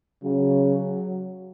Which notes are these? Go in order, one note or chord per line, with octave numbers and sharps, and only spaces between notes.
C#3 F#3